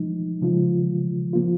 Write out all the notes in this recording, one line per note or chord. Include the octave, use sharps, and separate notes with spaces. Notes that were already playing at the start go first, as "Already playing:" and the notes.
Already playing: F3 G#3 D#4
C#3 F3 G#3 F4
F3 A#3 F4